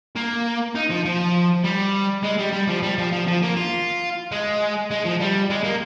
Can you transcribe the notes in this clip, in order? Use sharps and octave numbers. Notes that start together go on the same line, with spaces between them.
A#3
D#4
F3
F3
G3
G#3
G3
G3
F3
G3
F3
F3
F3
A#3
F4
G#3
G#3
F3
G3
G#3
A#3